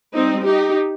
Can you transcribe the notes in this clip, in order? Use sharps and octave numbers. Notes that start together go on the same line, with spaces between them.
G3 C4 D#4
D#4 G4